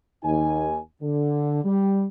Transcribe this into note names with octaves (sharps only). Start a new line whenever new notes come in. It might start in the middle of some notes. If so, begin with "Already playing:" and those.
D#2 D#4 G#5
D3
G3